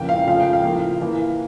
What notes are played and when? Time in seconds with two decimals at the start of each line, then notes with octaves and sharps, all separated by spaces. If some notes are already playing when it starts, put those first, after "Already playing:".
Already playing: F2 C#3 E3 A#3 G5
0.09 F5
0.27 C#3 F3 A3 F5
0.40 G5
0.53 F5
0.64 A2 F3 A#3
1.00 A2 E3 A#3